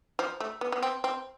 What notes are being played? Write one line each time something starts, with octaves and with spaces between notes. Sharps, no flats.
F3
A3
B3
B3
C4
C4